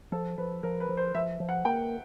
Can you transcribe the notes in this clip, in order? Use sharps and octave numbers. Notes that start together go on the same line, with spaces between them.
F3 A4
F3 B4
F3 A#4
B4
F3
C5
F3 E5
F3
F#5
A#3 G5